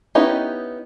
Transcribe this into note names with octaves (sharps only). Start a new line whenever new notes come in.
B3 C#4 D#4 E4 G4